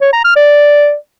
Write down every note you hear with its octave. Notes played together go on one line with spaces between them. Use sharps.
C#5
A#5
F6
D5